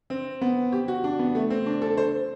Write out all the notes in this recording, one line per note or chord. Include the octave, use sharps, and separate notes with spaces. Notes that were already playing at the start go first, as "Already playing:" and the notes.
C4
B3
G4
F#4
D4
B3
A3
C4
D4
A4
C5